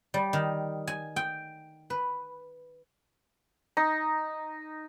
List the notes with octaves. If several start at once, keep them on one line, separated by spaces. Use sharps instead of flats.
G3
D#3
G#5
G5
B4
D#4